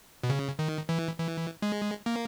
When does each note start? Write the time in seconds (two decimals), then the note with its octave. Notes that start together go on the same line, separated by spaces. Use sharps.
0.23 B2
0.29 C#3
0.59 D#3
0.89 E3
1.18 E3
1.62 G#3
2.06 A#3